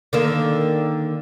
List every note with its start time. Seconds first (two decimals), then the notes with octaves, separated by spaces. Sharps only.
0.13 D3 D#3 A#3